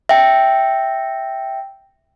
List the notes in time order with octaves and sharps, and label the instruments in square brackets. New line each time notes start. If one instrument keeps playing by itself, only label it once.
[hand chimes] E5 G5